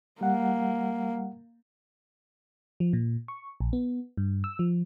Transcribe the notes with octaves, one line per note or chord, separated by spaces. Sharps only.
G3 A#3 F#5
F3
A#2
C#6
A#1
B3
G2
E6
F3